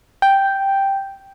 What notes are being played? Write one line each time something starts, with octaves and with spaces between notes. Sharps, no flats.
G5